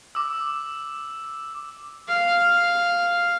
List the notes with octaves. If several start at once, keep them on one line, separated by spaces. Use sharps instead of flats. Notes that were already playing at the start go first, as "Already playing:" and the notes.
D6 E6
F5